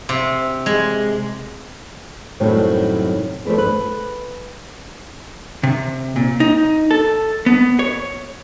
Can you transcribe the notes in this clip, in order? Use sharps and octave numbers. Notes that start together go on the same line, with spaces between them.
C3
G#3
F#2 A2 C3 D#3 F#3 G3
F3 A3 B4 D5
B4
C3
A#2
D#4
A4
B3
C#5